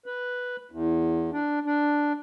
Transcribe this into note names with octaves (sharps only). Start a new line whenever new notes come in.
B4
E2
D4
D4